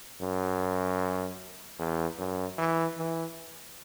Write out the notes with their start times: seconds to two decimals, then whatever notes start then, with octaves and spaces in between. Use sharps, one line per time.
0.21 F#2
1.79 E2
2.18 F#2
2.58 E3
2.97 E3